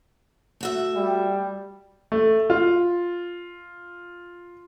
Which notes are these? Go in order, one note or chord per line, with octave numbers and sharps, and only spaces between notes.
A3 F#4 E5
G3
A3
F4